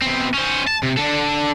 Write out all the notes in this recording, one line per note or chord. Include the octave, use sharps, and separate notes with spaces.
B2 C4
C#4 C5
A5
C3
D4 A4